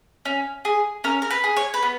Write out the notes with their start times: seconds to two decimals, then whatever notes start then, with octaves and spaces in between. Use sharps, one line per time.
0.25 C#4
0.65 G#4
1.04 C#4 A#4
1.22 A#4
1.30 B4
1.44 G#4
1.56 C#5
1.74 B4
1.82 B3